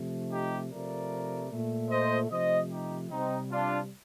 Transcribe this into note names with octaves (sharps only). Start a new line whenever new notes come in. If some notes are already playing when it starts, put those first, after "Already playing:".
Already playing: C3 F3 A3
D#4 G4
C3 F3 A3 A#4 D5
A#2 A3
C5 D#5
C3 F3 A3 C5 D#5
D#4 G4
C3 G3 C4 D#4
D4 F4